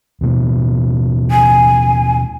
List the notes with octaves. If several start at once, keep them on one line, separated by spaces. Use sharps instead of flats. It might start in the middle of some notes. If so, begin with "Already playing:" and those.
D#2 B2
G#5